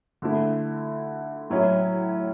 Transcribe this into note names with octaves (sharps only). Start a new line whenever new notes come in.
D3 A3 E4
A2 F#3 C#4 E4